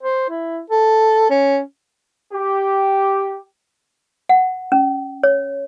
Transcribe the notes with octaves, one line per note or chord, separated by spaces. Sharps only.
C5
E4
A4
C#4
G4
F#5
C#4
C#5